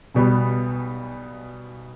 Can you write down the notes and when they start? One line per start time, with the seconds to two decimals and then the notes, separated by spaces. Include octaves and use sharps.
0.14 B1 B2 G3 B3